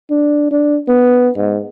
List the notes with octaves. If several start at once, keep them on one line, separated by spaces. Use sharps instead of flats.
D4
D4
B3
G#2